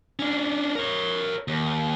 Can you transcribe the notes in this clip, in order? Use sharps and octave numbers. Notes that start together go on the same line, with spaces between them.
C#4 D4
A#4 C#5
D#2